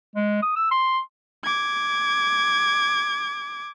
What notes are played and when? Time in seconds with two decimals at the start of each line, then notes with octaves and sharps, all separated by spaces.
0.15 G#3
0.42 D#6
0.56 E6
0.71 C6
1.44 D6 G#6